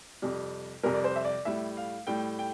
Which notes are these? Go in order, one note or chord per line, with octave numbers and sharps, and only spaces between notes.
F2 C3 G3
F2 C3 G3 A#4
D5
C5
E5
D5
A2 G3 E5
F5
A2 G3 G5
G5